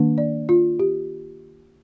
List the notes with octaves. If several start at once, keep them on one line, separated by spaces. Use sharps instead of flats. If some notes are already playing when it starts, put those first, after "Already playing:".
Already playing: D#3 A#3 D4
D5
F4
G4